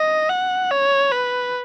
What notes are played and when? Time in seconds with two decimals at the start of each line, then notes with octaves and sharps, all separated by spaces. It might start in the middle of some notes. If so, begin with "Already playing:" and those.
Already playing: D#5
0.30 F#5
0.71 C#5
1.12 B4